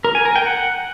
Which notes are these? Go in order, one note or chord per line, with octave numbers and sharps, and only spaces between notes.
A#4
G#5
A#4
G5
F#5